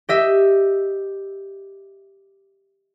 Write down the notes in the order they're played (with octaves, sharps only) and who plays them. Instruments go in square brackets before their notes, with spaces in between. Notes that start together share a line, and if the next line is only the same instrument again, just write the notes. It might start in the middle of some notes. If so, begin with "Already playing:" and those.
[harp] G4 D#5 E5